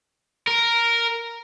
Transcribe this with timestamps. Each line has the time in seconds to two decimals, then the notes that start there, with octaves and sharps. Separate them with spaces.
0.48 A#4